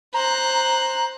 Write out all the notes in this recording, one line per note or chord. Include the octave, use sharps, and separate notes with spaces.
C5 A#5 F#6